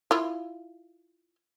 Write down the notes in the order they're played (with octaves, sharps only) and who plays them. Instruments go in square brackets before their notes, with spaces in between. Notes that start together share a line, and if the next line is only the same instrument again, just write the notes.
[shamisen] E4 F4